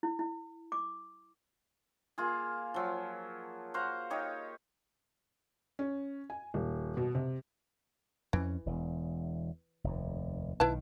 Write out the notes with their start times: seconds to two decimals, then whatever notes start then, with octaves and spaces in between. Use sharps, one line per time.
0.03 E4
0.19 E4
0.72 D6
2.18 A#3 F4 G#4
2.74 F3 F#3
3.74 F#4 C5 F5 A#5
4.10 D#4 G4 C#5 D#5
5.79 C#4
6.30 G#5
6.54 D#1
6.97 B2
7.15 C3
8.33 F2 E3 C4 C#4
8.66 E1 E2
9.84 F1 D#2
10.60 B1 D#3 E4 B4 A5